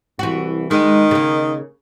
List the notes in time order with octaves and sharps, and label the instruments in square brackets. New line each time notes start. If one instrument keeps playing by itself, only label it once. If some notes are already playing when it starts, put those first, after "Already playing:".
[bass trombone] C2 [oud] E3 F#4
[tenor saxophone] D#3 [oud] G#3 [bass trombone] D#4
[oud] C#3 A#3